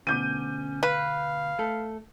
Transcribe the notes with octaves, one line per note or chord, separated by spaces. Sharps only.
D2 B2 C#4 D6 G6 D#7
B4 F5
A3 A4